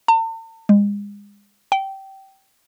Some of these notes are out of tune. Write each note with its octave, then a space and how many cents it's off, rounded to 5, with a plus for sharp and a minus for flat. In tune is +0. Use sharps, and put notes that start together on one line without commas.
A5 +45
G#3 -35
G5 -20